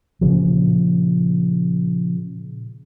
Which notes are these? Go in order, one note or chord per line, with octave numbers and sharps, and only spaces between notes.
A#2 C#3 F3